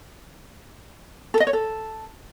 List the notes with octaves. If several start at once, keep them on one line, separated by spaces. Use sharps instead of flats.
A4
D#5
C#5
A4